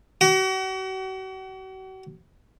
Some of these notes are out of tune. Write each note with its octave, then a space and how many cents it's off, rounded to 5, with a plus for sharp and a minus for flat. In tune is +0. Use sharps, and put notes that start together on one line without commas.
F#4 +40